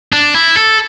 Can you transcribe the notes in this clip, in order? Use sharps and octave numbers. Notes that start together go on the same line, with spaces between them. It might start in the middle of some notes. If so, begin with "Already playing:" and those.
D4
E4
A4